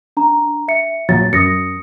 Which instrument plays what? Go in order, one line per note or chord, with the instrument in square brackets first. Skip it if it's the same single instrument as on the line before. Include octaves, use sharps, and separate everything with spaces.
[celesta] D4 A#5
E5 C#7
[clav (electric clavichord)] A#1 F#3 A#5 [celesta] A6
[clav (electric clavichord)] F#2 [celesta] D#6 A#6 C#7